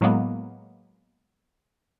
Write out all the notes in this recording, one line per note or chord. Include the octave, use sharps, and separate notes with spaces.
A2 F#3 G#3 A#3 B3